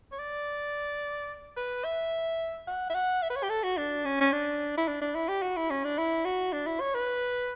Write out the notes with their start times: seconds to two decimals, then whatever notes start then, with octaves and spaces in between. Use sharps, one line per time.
0.12 C#5
0.19 D5
1.57 B4
1.84 E5
2.67 F#5
2.89 E5
2.95 F#5
3.23 E5
3.30 B4
3.36 C#5
3.43 G4
3.49 A4
3.63 F#4
3.77 D4
4.05 C#4
4.21 C#4
4.32 D4
4.78 E4
4.88 D4
5.01 D4
5.15 E4
5.29 G4
5.42 F#4
5.57 E4
5.70 C#4
5.84 D4
5.98 E4
6.25 F#4
6.53 D4
6.66 E4
6.80 C#5
6.95 B4